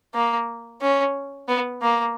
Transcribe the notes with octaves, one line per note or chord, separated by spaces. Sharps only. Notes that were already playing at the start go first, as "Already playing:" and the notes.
A#3
C#4
B3
A#3